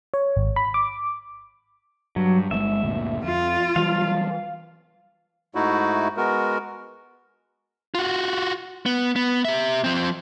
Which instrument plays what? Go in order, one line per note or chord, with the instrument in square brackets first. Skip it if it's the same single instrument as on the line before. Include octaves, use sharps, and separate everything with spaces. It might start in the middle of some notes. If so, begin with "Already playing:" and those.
[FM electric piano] C#5
G#1
B5
D6
[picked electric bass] G2 [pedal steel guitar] F#3
[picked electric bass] G1 D3 G#3 [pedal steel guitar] E5
[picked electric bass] G1 D2 A#2
[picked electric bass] F2 [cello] F4
[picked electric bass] E3 F#3 G3 [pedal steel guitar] F5
[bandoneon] G#2 A3 D#4 E4 F#4
G#3 B3 F#4 A#4
[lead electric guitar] F4 F#4
B3
B3
G4 E5
F3 C4